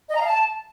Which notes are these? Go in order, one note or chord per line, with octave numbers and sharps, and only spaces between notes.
D#5
A#5
F5
A5